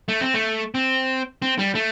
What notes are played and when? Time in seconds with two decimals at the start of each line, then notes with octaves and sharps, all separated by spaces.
0.08 A3
0.21 C4
0.34 A3
0.75 C4
1.42 C4
1.59 G3
1.75 A3